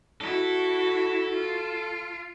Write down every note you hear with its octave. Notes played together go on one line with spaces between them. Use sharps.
E4 F#4 A4
F4